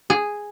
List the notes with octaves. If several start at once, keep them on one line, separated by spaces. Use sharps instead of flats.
G#4